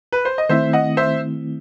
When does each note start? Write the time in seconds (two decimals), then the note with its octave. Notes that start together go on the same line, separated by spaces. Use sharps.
0.12 B4
0.25 C5
0.38 D#5
0.49 D#3 A3 C4 E4 C5 E5
0.73 D#5 F#5
0.97 C5 E5